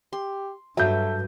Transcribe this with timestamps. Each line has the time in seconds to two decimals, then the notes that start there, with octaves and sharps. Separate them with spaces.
0.13 G4 C6
0.77 G2 F#3 A4 B4 E5 G6